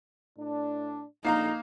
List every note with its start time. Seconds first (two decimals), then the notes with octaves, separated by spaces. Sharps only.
0.38 A2 D4
1.25 A#1 D3 A#3 D#4 F5 A#5